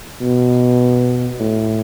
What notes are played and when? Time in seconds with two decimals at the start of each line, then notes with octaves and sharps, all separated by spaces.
0.21 B2
1.40 A2